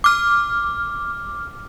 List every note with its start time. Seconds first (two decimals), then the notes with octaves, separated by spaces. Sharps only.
0.04 D6 F6